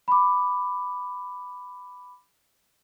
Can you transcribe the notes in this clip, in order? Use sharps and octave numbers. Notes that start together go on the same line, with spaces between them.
B5 D6